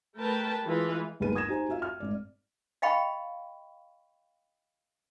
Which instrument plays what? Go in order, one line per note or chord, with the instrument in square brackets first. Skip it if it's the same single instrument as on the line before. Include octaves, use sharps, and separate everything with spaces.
[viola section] A3 A#4 B4 G5 A5
E3 G#3 E4 F4 B4
[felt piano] G1 D#2 G#4 B4 D#7
D#6 G#6 A#6 E7
D#4 F#4 G4 C5 G#5
F4 F#4 E5 F5
F6
G#1 D5
[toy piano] D#5 F5 G5 B5 C#6